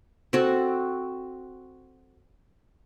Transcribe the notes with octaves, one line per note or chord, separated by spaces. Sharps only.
C4 F#4 A4 C#6